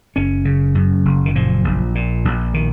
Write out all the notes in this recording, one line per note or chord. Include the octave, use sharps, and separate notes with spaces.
F#1 C#4
C#3
F#2
F#1
D#3
A#2 F3
A#1
A#2
A#1
D#3